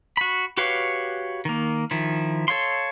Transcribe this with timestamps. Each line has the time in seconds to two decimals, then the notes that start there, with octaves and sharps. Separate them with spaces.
0.17 F#4 B5
0.57 F#4 G4 B4 C#5 F5
1.45 D#3 A#3
1.91 D#3 F3 E4
2.48 A4 C#5 F5 C6